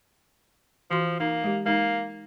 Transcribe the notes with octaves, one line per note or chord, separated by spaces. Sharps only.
E3 F3 F#4 C6
A#3 D#4
G#3 G4
G#3 A#3 D#4